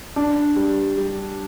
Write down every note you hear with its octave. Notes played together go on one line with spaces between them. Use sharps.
D4
G3
G3